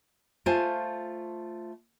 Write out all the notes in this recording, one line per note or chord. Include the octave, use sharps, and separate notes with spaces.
A3 F4 C5 F5 G#5 A5